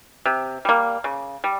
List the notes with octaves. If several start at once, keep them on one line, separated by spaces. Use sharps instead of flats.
C3
G3 A#3
C#3
G3